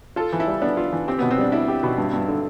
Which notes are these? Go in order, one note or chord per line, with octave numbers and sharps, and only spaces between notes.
F4 A4
E3
E4
G3
B3 D4
F4
E3
C4 G4
B3
B2
C4
G3 D4
D4 E4
G4
B2
G2
G2
D3